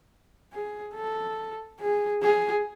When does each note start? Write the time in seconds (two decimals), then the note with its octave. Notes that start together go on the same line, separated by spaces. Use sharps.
0.52 G#4
0.95 A4
1.80 G#4
2.22 G#4